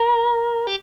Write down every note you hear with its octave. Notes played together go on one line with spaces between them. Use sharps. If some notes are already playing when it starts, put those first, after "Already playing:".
Already playing: A#4
G4